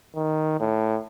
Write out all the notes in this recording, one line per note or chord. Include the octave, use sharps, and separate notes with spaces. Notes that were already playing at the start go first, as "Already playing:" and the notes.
D#3
A2